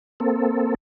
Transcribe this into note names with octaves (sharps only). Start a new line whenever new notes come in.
A#3 C4 A4